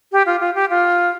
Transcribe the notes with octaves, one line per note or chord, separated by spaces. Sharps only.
G4
F4
F4
G4
F4